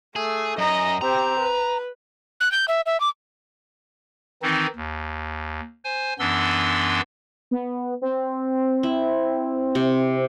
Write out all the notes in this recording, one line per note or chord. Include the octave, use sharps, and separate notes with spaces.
A3 G#4
F#2 D#5 A#5
C4 G4 A#5
B4
F#6
G6
E5
E5
D6
D#3 E3 C4 D#4
D#2
C5 G#5
F#2 E3 B3 D4 C6 E6
B3
C4
E4
C3